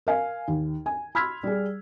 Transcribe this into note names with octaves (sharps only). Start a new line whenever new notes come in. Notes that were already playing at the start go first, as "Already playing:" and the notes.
A#4 F5 G#5
D#2
G#5
B5 C6 E6 F6 G#6 B6
G3 G#4